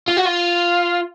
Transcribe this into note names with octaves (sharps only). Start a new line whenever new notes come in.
F4
F#4
F4